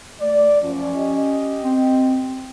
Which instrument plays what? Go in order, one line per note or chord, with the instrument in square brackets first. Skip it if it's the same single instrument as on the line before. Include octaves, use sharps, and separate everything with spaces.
[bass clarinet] A3 [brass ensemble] D5
[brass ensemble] F#2 F3 [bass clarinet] C#4
[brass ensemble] G4 D#5
[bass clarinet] C4